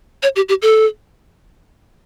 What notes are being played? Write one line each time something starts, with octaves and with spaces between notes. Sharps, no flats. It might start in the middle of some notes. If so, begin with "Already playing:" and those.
C#5
G4
G4
A4